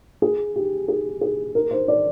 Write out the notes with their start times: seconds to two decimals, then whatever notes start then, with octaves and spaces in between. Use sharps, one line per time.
0.22 G#4
0.56 G4
0.88 G#4
1.21 G#4
1.55 A#4
1.71 C5
1.88 D5